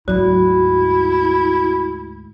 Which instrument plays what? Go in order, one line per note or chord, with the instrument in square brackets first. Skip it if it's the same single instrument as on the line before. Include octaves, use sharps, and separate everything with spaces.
[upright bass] D2 G#2 [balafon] F#3 [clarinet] E4 [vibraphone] F#4